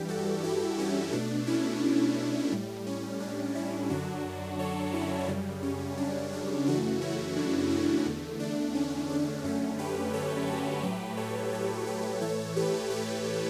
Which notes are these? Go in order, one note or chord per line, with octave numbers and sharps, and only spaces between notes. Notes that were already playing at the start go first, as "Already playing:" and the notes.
Already playing: G2 E3 G3 G4
F#4 A4
E4 G4
C#4 E4
B2 A3 D4
C#4 E4
A2 G3
C#4
D4
C#4 E4
F#2 D3 F#3 D4 F#4
A4 C#5
C#4 E4
F#2 C#3 G3
C#4
D4
D4
F#2 C#3 E3 A3 D4 F#4
C#4 E4
D4
C#4 E4
E2 D3 A3
D4
C#4
D4
F#2 D3 A3 C#4
G4 B4
A4 C#5
F#4 A4
A2 F#3 A3 G4 B4
A4 C#5
A4 C#5
G4 B4
A2 E3 A3 A4 C#5
G4 B4
G4 B4